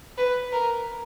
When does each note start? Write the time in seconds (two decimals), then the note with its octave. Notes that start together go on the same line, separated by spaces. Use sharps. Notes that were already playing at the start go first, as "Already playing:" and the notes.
0.18 B4
0.52 A#4